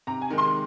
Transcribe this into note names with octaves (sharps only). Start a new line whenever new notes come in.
C3 A#5
G#5
D#3 G#3
C6